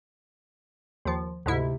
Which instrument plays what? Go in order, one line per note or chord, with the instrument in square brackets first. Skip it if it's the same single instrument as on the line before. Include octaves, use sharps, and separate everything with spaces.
[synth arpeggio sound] D#2 F3
[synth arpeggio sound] D2 G#2 E4 [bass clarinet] C3